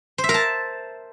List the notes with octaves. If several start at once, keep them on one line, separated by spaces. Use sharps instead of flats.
C5
E5
A#4
A5